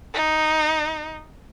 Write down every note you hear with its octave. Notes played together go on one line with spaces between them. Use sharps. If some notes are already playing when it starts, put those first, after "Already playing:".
D#4